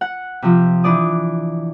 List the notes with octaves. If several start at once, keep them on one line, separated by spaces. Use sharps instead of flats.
F#5
C3 F3
E3 D4 D5 D#6